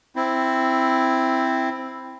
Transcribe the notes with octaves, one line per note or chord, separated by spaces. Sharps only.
C4 E4